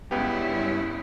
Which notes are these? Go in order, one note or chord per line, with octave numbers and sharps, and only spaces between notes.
C#2 G2 B3 C#4 E4 G4